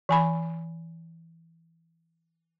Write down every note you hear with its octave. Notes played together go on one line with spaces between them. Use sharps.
E3 G#5 B5